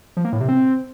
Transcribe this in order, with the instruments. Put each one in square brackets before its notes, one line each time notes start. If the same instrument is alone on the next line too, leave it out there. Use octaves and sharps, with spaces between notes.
[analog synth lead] F3
A#3
A2
C3
C4